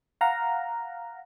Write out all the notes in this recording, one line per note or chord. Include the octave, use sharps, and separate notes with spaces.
F5 F#5 A#5